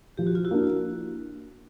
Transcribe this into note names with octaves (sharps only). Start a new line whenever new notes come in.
F3 G4
F#4
F4
E4 F#4
A#3 D4